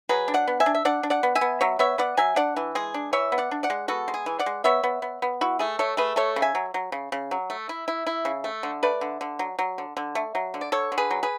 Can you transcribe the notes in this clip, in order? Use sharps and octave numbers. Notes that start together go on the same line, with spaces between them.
F#3 G#4 B4
D4
D5 F#5
B3
E5 G#5
D4
E5
D4 D5 F#5
D4
D5 F#5
B3
E5 G#5
B3
F#3 C#5 E5
B3 C#5 E5
B3 D5 F#5
F#3 E5 G#5
D4 D5 F#5
E3
G#3 G#4
D4
E3 C#5 E5
B3
D5 F#5
D4
D5 F#5
G#3
B3 F#4 A4
G#3
G#4
E3
D5 F#5
G#3
B3 C#5 E5
B3
B3
B3
E4 F#4
A3 G#4
A3 A4 C#5
A3 G#4 B4
A3 A4 C#5
C#3
E5 G#5
F#3
F#3
C#3
C#3
F#3
A3
E4
E4
E4
C#3
A3
D3
A3 B4 D5
D3
D3
F#3
F#3
D3
D3
A3
F#3
D3
D5
D3 A4 C#5
D3
G#4 B4
F#3
G#4 B4